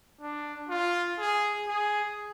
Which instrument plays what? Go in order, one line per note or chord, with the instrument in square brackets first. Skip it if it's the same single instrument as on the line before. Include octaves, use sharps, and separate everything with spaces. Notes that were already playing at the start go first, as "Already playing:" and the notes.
[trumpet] D4
F4
G#4
G#4